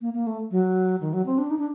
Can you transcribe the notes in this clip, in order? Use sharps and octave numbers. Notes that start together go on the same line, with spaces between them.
A#3
A#3
A3
F#3
D#3
F#3
C4
D4
D#4
D4